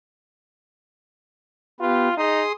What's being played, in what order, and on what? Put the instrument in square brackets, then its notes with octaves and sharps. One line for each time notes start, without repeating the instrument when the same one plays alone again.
[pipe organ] B3 G4 B4 [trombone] F4
[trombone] D#4 [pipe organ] G#4 C6 D#6